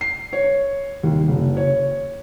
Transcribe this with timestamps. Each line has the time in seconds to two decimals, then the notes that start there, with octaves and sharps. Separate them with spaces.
0.01 C7
0.33 C#5
1.04 D#2
1.28 F#1
1.57 C#5